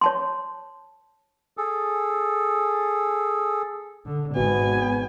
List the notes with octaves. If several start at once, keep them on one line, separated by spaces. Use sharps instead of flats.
C#5 A5 C6
G#4 A4
D3
G#1 B2 B3 G#5